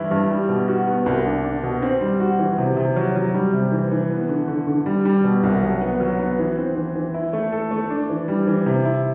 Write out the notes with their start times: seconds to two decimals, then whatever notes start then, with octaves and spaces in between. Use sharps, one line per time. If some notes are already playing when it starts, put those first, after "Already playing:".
Already playing: G2 E3 E4
0.11 G2
0.30 G3
0.49 B2
0.68 F#4
0.87 B3
1.06 C2
1.25 D4
1.44 D4
1.63 B2
1.82 C4
2.01 G3
2.20 F#4
2.39 E3
2.58 C3
2.77 C3
2.96 F#3
3.16 F#3
3.34 G3
3.53 C3
3.72 E3
3.91 E3
4.10 B3
4.29 D3
4.48 D3
4.67 D3
4.86 G3
5.05 G3
5.24 B2
5.43 C2
5.62 F#3
5.81 B3
6.00 F#3
6.19 B3
6.39 E3
6.57 C4
6.76 E3
6.95 E3
7.14 E4
7.33 A3
7.52 A4
7.71 A3
7.90 D4
8.10 E3
8.28 G3
8.47 E3
8.66 C3
8.85 E4